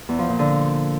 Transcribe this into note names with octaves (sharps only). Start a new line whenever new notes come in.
E2
F3
A#2
D3